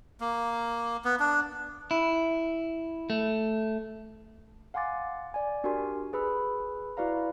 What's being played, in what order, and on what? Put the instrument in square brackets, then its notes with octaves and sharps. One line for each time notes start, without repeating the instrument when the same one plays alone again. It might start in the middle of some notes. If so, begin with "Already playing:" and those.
[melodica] A#3
B3
D4
[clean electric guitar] E4
A3
[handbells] F5 F#5 G#5 C6 D6 A6
D5 G#5
D4 F#4 G4 A#4 G#5 C6
G#4 B4 B5 E6
E4 F#4 B4 D5 F5 A#5